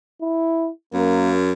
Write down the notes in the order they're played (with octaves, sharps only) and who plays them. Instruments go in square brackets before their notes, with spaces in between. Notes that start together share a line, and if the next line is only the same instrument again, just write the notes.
[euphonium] E4
[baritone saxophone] F#2 [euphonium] A#3